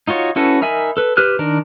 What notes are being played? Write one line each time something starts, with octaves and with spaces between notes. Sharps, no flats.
D#4 F4 F#4 C#5
C#4 E4 F#4 A4 B4
D#4 A#4 E5 G#5 B5
A4 B4
G4 B4 C5 F6 F#6
D#3 D4 A#4